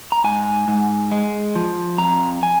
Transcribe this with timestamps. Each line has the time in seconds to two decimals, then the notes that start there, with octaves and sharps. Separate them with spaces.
0.12 A#5
0.24 G#2 G#5
0.68 G#2
1.12 G#3
1.56 F3
1.98 F2 A#5
2.43 G#5